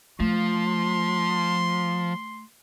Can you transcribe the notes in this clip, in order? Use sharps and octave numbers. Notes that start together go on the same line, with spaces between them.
F3 A3 C6